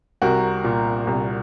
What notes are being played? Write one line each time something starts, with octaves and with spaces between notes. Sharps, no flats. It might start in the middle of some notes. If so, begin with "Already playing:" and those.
C2 F#4 A#4
A#2
C2